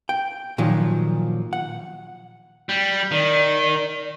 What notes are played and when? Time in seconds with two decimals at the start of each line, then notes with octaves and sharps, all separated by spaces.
0.09 G5
0.58 A#2 D#3 F3 F#3
1.53 F#5
2.69 G3
3.11 D#3 D5